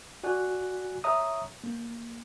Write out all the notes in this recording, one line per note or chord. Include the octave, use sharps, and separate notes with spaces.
F#4 D5 G#5 F#6
C#5 E5 A#5 D#6
A#3